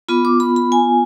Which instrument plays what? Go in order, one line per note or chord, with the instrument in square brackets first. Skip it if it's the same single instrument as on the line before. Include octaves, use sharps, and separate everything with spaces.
[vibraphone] B3 F4 B5
D6
B5
B5
G#5